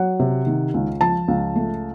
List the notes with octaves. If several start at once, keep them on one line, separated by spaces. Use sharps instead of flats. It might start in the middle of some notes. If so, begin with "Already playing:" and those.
Already playing: F#3 F#5
C3
D#3
C#2
F3 A5
C#2
A3